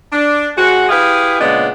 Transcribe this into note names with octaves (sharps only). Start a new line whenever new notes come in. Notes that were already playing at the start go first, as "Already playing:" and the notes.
D4
G#3 C4 F#4
E4 G4 G#4 B4 F5
A#2 C#3 G#3 B3 D4